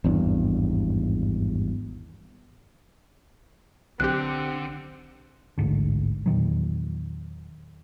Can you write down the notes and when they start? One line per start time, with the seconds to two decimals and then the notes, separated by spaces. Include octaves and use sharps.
0.04 G#1 E2 G2
4.00 B1 D3 C4 G4 F#6
5.58 A1 D2 G#2 D3
6.26 E2 A#2 D#3 F#3